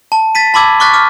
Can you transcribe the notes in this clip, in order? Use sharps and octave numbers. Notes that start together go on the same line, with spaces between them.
A5
A6 B6 D#7
A5 B5 C6 D6 E6 G#6
C#6 D6 F6 F#6 A6 B6
D6 F6